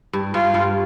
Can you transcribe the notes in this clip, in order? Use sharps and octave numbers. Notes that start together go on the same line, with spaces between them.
G2
G2 F4
G2